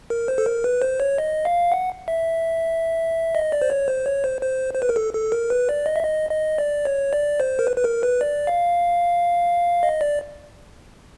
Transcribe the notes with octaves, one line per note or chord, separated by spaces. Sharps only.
A#4
C5
A4
A#4
B4
C5
C#5
D#5
F5
F#5
E5
D#5
D5
C5
C#5
C5
C#5
C5
C5
C5
B4
A#4
A4
A4
A#4
B4
D5
D#5
E5
D#5
D#5
D5
C#5
D5
C5
A#4
B4
B4
A#4
B4
D5
F5
D#5
D5